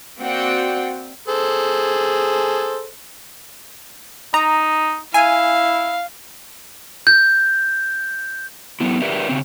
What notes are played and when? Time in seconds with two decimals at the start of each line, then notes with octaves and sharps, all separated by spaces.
0.19 A#3 C4 F#4 D5 F#5 G5
1.28 G#4 A4 C5
4.34 D#4 A#5
5.14 E4 F5 G#5
7.07 G6
8.80 F#3 B3 E4
9.02 G4 A#4 B4 D5 E5
9.29 C#3 C4